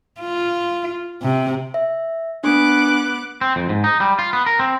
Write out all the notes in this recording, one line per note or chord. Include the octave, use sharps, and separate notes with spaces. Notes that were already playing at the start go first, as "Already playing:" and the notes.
F4
C3
E5
B3 D4 D6 F#6
C4
F2
G#2
D#4
G3
F4
B3
A#4
C4